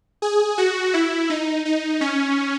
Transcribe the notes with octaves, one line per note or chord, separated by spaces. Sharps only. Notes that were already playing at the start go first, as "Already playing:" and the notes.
G#4
F#4
E4
D#4
D#4
C#4